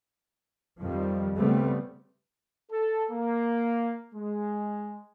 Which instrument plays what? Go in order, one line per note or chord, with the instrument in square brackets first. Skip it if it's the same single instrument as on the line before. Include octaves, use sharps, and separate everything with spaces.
[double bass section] F2 D#3 F3 G3
C#3 G3 A3 B3 C4
[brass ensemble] A4
A#3
G#3